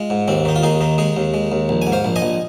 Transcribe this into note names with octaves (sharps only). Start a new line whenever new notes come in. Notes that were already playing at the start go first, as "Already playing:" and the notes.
Already playing: G#3 F4
G#2
D#2 C4
D#3 D#4
F4
D#2 D#4 G#4
D#3 D#4
G#3 D#4 G#4
D#2
G#3
D#2
A#1
G#5
G#2
C5 F5
A#1
D#5 G#5
A#1